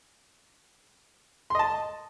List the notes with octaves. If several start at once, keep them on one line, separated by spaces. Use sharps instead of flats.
D#5 A5 C6